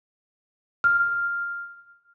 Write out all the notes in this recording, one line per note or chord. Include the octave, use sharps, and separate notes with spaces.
F6